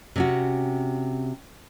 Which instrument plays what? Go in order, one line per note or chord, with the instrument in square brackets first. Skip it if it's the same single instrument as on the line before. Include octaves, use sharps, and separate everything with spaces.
[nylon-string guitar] C3 C#4 F#4